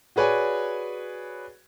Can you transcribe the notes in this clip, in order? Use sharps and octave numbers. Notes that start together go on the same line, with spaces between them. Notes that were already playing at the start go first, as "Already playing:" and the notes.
F#4 G#4 B4 C#5 D5 G#5